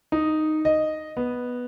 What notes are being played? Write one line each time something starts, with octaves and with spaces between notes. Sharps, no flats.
D#4
D#5
B3